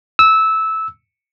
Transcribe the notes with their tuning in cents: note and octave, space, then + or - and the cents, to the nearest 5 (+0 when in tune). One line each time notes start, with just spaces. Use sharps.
E6 -15